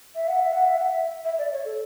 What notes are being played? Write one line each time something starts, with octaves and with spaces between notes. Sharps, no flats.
E5
F#5
E5
F#5
E5
F#5
E5
E5
D5
C#5
A4